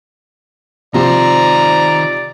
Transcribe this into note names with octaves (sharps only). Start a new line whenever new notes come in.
C3 D#3 F3 C5 D5 A#5